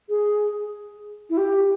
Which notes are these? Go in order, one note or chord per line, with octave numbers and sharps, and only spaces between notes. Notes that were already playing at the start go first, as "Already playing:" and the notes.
G#4
E4
G4